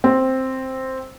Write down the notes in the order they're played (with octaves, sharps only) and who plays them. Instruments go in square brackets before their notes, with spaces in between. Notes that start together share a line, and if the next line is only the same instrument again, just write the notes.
[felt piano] C4